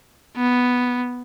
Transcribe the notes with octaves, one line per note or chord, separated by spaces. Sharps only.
B3